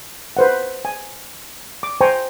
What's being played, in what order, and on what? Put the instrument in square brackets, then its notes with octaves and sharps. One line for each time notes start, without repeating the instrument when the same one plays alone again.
[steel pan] B4 C5 F#5
G#5
D6
C5 G5 G#5 A#5 C#6